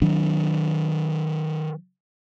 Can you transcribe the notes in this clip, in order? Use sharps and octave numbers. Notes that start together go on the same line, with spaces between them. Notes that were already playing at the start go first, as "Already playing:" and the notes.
D#3 F#3 D4